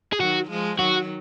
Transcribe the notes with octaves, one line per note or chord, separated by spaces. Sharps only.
G#4
D#3 F#3 F#4
F3 G#3
D#3 F#3 F#4